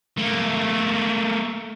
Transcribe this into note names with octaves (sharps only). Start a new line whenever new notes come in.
A3 A#3